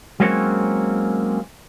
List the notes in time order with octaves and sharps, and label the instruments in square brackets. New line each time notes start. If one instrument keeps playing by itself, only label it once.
[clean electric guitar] F#3 G#3 A#3 C4 C#4 C#5